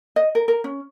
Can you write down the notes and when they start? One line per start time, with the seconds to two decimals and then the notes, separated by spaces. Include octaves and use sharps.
0.16 D#5
0.35 A#4
0.48 A#4
0.64 C#4